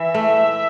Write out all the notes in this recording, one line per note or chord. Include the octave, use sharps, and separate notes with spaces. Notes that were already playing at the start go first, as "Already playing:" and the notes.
Already playing: E3 E5
A3